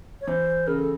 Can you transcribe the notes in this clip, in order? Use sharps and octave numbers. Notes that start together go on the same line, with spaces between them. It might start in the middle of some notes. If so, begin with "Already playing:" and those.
C#5
E3 C5
C#3 A#4
A4